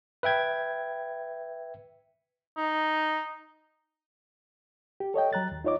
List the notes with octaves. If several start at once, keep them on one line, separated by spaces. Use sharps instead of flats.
B4 E5 G5 G#6
D#4
G4
A4 C#5 D#5 G5
F#3 A#5 F#6 A6
D#2
D#4 F4 C#5 D#5 D6